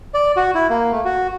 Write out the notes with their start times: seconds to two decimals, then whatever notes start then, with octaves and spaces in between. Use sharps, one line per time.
0.14 D5
0.37 F#4
0.55 E4
0.70 A#3
0.92 A3
1.05 F#4